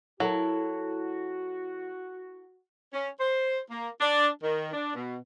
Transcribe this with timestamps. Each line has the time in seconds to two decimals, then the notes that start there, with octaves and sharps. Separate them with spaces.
0.20 F#3 E4 F#4 A4 A#4
2.93 C#4
3.20 C5
3.71 A#3
4.01 D4
4.43 D#3
4.73 D4
4.95 B2